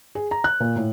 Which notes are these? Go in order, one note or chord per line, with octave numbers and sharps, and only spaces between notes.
G#4
A#5
F#6
A#2
A2